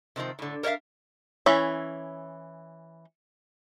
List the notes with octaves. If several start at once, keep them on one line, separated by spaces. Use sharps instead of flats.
C3 D#3 F3 C4
A2 D3
A#4 C#5 D5 E5 F5
E3 C#4 C#5 E5